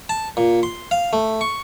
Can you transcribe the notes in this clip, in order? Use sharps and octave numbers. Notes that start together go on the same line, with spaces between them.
A5
A#2
C6
F5
A3
C#6